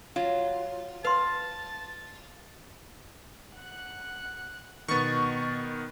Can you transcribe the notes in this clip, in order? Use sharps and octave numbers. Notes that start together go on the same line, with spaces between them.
F#3 F4
B4 F5 A5 C6
F#5 F#6
B2 D#3 B3 C#6 A6